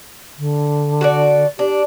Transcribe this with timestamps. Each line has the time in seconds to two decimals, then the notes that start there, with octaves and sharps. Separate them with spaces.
0.38 D3
1.01 F#4 A4 D5
1.59 D4 G4